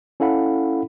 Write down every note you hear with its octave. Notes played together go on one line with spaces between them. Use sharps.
C#4 E4 A4 F5 F#5 B5